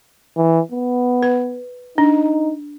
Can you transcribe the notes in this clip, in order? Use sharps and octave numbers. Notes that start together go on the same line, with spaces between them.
E3
B3
B4
D4 D#4